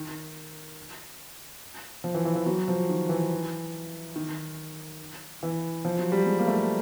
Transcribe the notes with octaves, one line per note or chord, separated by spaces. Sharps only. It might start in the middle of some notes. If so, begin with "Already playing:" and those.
Already playing: D#3
F3
E3
E3
E3
F#3
F3
D#3
E3
D#3
E3
F3
F#3
G3
G#3
A#3
A3